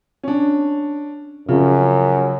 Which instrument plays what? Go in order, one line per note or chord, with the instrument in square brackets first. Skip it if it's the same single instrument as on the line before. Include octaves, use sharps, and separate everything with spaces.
[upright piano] C#4 D4
[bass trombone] F#2 [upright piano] C#3 F3